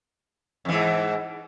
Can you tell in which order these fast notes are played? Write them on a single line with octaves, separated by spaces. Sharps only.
F2 E3 G#2